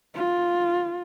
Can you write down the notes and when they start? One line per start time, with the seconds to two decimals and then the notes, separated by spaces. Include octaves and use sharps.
0.15 F4